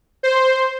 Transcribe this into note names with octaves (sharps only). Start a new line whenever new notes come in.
C5